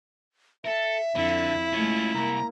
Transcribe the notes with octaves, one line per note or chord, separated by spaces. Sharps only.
A4 A#4 E5
F2 D3 E4
G#3 A3 C#4 F4
C2 A#3 A#5